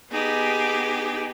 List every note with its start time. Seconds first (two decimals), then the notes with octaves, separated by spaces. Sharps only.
0.11 B3 D#4 G4 G#4